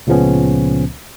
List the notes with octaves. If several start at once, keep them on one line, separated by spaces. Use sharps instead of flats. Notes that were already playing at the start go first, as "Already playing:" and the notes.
C#2 A#2 C#3 F3 B3 C#4